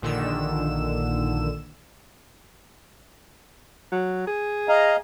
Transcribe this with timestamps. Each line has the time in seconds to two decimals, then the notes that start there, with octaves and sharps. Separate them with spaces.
0.02 A#1 A#2 D3 D#3 E6 E7
3.92 F#3
4.27 G#4
4.69 D#5 F5 A#5